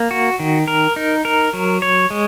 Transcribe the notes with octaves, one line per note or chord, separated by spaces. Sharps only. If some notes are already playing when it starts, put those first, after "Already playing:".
Already playing: A#3
F#4
D#3
A#4
D#4
A#4
F#3
C#5
G#3